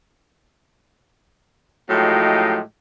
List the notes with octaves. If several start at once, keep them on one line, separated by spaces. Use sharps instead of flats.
A2 F3 F#3 G#3 D#4 G4